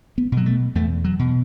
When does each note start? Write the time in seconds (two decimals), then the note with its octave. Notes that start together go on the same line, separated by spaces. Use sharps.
0.18 B3
0.32 B2
0.37 F#3
0.46 A3
0.75 E2 A3
1.04 F#3
1.19 B2